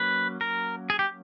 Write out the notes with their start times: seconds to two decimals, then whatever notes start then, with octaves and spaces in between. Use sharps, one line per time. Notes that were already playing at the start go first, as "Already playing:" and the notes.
Already playing: F#3 A#3 C#4 B4
0.41 A#4
0.90 G#4
0.99 G4